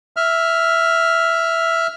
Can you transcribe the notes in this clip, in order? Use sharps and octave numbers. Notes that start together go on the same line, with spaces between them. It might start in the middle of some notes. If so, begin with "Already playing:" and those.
E5 F6